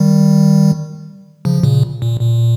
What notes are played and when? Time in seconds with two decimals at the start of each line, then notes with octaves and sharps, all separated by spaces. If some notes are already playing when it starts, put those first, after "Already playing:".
Already playing: D#3 G3
1.45 C#3 F3
1.63 A#2 C#3
2.02 A#2
2.21 A#2